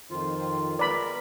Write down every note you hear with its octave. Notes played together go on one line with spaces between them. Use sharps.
F2 D#3 F4 C5
G#3 B3 A#4 B4 D5 B5